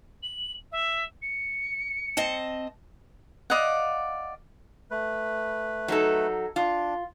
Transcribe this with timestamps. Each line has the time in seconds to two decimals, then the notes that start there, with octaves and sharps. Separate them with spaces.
0.22 F#7
0.71 E5
1.22 C#7
2.17 C4 D#5 A5
3.50 D5 D#5 F5 F#5
4.91 A3 B4
5.88 F#3 D#4 A4
6.56 D4 F4